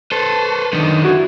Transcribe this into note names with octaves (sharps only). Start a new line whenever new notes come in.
A4 B4 C5
F#2 D3 D#3 D#4
E4 F#4